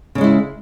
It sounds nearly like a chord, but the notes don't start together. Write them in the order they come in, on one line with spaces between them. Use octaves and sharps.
C#3 C#4 G#3 E4